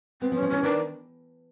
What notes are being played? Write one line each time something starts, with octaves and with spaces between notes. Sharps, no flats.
B3 C4
F3
C#4
F3
E3 C#4
D#3 D4